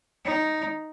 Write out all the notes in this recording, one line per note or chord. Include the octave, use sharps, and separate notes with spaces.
D#4